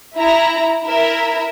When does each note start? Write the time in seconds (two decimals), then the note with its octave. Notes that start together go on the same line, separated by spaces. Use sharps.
0.18 E4 A#5
0.86 E4 A#4 E5